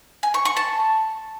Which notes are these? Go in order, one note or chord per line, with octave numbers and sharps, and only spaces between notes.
G#5
C#6
C#6
A5